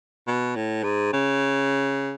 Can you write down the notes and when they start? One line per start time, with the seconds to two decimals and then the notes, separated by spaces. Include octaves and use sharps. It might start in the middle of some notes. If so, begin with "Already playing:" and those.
0.27 B2
0.56 A2
0.84 G#2
1.13 C#3